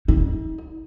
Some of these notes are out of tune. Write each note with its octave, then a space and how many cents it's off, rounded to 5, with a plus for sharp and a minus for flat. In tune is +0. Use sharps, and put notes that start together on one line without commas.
D#4 +45